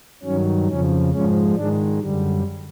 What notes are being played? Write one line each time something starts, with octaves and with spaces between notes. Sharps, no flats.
G2 D#3 F#3 C#4
F2 C#3 F3 C#4
G#2 F3 G#3 C#4
G#2 D#3 G#3 D4
F#2 D3 G3